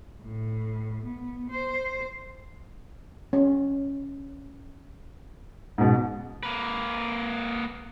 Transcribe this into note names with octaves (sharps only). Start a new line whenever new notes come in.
A2
B3
C5
C#4
G#2 B2
A#3 B4